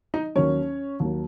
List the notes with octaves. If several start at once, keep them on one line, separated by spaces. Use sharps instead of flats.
D#4 D#5
D#2 D#3 F#3 C#4 C#5
D#2 D#3 F#3